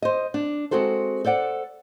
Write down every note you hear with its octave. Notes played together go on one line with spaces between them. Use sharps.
C5 D#5
D4
G#3 C4 F#4 A4 C5
A4 C5 D5 F#5